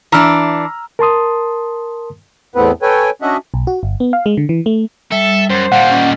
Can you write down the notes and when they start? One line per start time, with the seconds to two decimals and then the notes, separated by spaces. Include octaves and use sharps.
0.12 E3 D4 A#5 E6 F6
0.99 A#4 A5 C6 D#6
2.55 E2 A2 B3 C4 B4
2.82 A4 B4 C#5 G5 G#5
3.22 C#4 D4 F#4 D#5 E5 F#5
3.54 B1
3.67 F#4
3.83 G1
4.00 B3
4.13 F5
4.26 G#3
4.37 D3
4.49 E3
4.66 A3
5.12 G3 A4 E5
5.50 F#2 C5
5.72 A#2 G3 F5 F#5
5.91 C#4 D#5